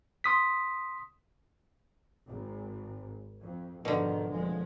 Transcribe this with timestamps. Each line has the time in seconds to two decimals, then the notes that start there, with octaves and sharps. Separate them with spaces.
0.24 C6 D#6 B6
2.27 G#1
3.42 F2
3.85 G#2 B2 D3 D#3 F3
4.33 F1 F3 G#3